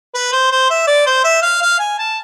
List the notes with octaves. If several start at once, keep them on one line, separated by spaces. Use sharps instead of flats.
B4
C5
C5
E5
D5
C5
E5
F5
F5
G#5
A5